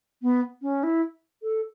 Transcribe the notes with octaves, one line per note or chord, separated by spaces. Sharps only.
B3
C#4
E4
A4